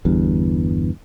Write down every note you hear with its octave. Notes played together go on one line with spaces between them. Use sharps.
G1 E2 G2